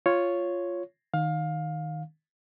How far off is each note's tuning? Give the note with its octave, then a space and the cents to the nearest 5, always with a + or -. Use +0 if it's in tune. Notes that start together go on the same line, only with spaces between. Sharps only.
F4 +0 C#5 +0
D#3 -5 F5 +20